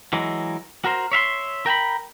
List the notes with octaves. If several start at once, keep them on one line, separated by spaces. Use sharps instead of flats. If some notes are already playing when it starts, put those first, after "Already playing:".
E3 F#3 G#3
F#4 A#4 C5
C#5 E5 F5 C6
A#4 G5 A5 B5